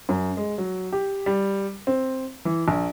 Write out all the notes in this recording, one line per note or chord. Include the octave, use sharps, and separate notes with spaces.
F#2
G#3
F#3
G4
G3
C4
E3
A#1